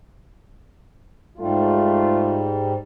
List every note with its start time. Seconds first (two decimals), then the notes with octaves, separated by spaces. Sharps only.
1.38 G#2 G3 A3 F4